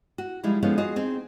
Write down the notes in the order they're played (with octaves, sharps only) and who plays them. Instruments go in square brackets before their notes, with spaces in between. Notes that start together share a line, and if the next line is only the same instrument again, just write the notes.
[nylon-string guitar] F#4
F3 G3 G#3 D#4 E4
D3 F3 G#3 B3 C#4 D#4
F4 F#4 G#4 D#5
C4 D#4 G#4